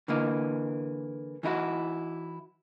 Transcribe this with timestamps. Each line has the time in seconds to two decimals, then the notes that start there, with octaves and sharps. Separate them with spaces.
0.08 D3 E3 A#3 D#4
1.43 E3 D#4 E4 F#4